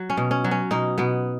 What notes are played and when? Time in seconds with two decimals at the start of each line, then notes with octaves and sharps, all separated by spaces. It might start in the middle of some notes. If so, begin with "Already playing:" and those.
Already playing: F#3
0.10 C#4
0.17 B2
0.31 C#4
0.44 F#3
0.51 C#4
0.71 B2 D#4
0.98 B2 B3